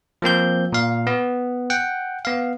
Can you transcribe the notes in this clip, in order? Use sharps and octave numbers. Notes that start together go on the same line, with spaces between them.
F3 A#3 C4 G6
A#2 F5
B3
F#5 G5
B3 F5